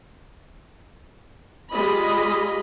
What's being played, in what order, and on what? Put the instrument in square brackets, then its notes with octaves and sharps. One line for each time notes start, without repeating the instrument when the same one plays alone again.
[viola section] G3 G#3 F4 D#5 B5